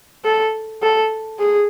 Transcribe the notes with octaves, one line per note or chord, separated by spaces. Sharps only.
A4
A4
G#4